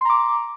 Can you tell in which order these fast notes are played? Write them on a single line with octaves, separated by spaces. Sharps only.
C6 A#5 D6